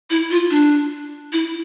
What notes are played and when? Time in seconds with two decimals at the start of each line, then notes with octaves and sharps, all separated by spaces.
0.10 E4
0.31 F4
0.51 D4
1.33 E4